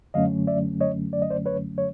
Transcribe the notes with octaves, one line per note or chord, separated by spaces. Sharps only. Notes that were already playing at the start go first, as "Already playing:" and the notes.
F#2 D3 F#3 A3 C#4 D#5 F5
D5 E5
C#5 D#5
D5
D#5
C5 D5
B4 C#5
C#5